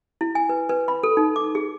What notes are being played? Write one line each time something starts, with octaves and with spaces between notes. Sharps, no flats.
E4
G#5
B4
B4
B5
A4
D#4
D6
G#4